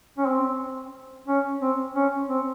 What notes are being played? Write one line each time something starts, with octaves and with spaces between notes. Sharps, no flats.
C#4
C4
C#4
C4
C#4
C4